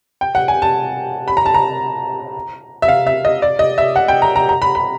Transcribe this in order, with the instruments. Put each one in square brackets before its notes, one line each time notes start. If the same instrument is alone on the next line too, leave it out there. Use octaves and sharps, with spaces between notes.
[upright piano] G5
F#5
G#5
A5
B5
A#5
A5
A#5
E5
F5
E5
D#5
D5
D#5
E5
F#5
G5
A#5
A#5
A#5
B5
B5